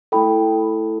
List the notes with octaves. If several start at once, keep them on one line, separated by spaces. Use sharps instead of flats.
A3 E4 A4 G5 B5